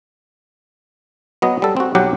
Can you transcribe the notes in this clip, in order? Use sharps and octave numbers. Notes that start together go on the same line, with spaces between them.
F#3 B3 D#5
G3 A4
C4 F#4
B1 F#3 G4 F#5